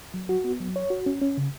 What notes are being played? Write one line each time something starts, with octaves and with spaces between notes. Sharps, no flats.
F#3
F#4
B3
F#3
C#5
F#4
C#4
C#4
C#3